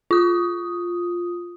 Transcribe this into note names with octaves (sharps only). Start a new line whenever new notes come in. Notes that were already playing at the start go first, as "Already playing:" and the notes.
F4 D#6